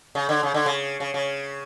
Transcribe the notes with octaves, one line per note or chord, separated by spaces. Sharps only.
C#3
D3
C#3
D3
C#3
C#3
C#3